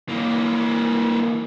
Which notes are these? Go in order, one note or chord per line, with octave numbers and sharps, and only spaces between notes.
E3 A#3